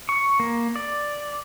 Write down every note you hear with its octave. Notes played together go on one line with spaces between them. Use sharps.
C#6
A#3
D5